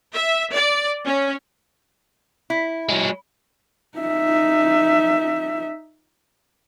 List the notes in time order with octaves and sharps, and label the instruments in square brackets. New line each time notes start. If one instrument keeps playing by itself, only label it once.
[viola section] E5
D5
C#4
[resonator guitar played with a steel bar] E4
[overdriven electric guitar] F#3 G#3
[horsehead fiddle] D#4 E5